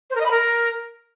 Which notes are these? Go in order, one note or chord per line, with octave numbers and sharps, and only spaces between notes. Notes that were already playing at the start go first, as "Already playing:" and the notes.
C5
A#4
D#5
B5
A#4